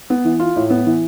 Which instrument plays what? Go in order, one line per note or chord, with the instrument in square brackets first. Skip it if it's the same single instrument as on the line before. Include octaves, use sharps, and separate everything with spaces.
[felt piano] B3
E3
F4
A2
B3
E3